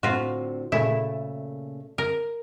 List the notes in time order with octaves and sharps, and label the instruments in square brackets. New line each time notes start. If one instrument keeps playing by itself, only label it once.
[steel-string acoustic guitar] A2 D3 C4 [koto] F4 F#4
[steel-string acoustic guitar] A#2 C#3 A3 [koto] E4
[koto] A#4